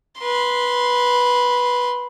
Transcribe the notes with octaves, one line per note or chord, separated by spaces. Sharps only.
B4 C6